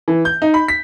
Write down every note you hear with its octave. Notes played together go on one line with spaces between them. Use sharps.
E3
G6
D#4
B5
B6